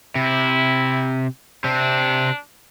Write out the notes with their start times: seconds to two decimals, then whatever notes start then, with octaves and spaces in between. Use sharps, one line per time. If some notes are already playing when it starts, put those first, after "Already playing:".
0.15 C3 E4
1.64 C3 C4 D4